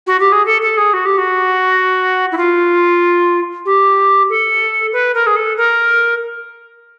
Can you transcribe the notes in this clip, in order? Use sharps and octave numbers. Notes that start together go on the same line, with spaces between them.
F#4
G4
G#4
A4
A4
G#4
F#4
G4
F#4
E4
F4
G4
A4
B4
A#4
G#4
A4
A#4